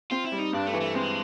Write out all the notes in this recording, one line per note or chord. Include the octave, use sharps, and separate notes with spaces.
C4 F4
E4
G3
D#4
G2 D4
A3
E3
A3
G#3 C4